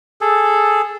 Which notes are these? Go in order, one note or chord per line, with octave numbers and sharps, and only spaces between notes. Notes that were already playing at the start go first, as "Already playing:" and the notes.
G#4 A4